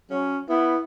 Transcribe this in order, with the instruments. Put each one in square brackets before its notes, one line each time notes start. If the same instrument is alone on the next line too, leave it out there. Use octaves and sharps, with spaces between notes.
[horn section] F#3 C#4
[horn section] B3 [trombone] E4